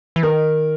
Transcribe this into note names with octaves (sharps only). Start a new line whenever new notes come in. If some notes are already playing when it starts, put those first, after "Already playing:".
E3
D#3 A#4